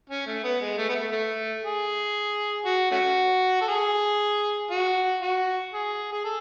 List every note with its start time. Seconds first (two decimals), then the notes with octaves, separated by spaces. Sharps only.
0.10 C#4
0.27 A3
0.44 B3
0.61 G#3
0.78 A3
0.89 B3
0.95 A3
1.12 A3
1.64 G#4
2.66 F#4
2.91 A3 C#4 F#4
3.61 A4
3.68 G#4
4.71 F#4
5.22 F#4
5.73 G#4
6.12 G#4
6.25 A4